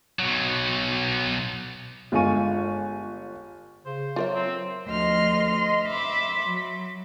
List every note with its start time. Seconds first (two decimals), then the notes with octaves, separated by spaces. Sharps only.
0.19 B1 F#3
2.12 G1 G#3 F4 G#5 C#6 D#7
3.86 C#3 C5
4.16 F#3 F4 A#4 E5
4.34 C4
4.88 D2 F3 D#5 C6 F6
5.56 D#5 C6
5.86 E5 B5 C6 D6
6.47 F#3